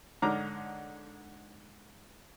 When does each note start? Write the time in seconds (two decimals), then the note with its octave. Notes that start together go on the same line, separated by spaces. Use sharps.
0.22 G#2 D3 C#5 A#5 D6 F6